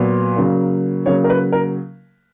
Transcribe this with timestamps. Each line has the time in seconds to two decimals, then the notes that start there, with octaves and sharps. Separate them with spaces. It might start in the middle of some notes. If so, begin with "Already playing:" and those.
Already playing: A#2 F#3 B3
0.36 C#3 F#3 A#3
1.06 C#3 F#3 A#3 C#5
1.24 A#4
1.30 B4
1.52 A#4